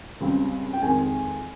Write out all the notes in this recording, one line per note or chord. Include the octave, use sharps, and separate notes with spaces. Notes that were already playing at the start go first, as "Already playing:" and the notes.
C#2 C#3 G3 C4
G5
F2 D#3 G#3 C4 G#5